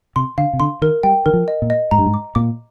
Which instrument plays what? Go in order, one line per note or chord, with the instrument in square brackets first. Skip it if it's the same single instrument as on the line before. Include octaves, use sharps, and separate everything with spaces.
[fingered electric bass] C3 [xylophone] C6
[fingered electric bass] D3 [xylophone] F5
[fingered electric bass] C3
[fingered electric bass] D3 [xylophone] C6
[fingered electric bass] D#3 [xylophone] A#4
[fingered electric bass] G3 [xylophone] G5
[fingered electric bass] D#3 [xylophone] A#4
[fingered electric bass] F3
[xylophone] D#5
[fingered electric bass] A#2
[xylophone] D#5
[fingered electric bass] G#2 [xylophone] A#5
[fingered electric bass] G2
G#2
[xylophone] D6
[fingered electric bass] A#2 [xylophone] D6